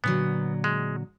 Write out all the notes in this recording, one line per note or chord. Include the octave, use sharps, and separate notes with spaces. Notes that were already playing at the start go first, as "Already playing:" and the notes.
A#2 D3 F#3 B3
G#3